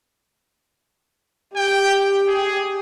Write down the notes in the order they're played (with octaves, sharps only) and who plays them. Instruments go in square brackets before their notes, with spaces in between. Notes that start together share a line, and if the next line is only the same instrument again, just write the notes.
[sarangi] G4 [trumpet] G5
[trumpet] G#4